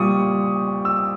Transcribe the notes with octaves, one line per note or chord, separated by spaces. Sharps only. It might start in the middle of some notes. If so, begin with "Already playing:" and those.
Already playing: A#2 G3 C#6 D#6
E6